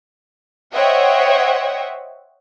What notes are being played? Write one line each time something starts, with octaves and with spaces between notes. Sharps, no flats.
C5 C#5 D#5 E5 F#5 G5